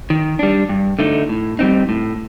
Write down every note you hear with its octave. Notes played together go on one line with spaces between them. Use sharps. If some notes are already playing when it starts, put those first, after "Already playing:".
D#3
G3 D4
G2
D3 A3 D#4
A2
G3 C4 D#4
A2